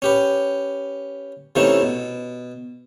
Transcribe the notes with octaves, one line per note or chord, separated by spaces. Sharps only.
C#4 G4 B4
C3 E3 A3 C#4 D#4 E4
B2